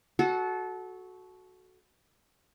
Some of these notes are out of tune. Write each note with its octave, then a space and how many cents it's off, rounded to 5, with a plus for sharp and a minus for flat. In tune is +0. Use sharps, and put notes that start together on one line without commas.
F#4 +0 A4 -25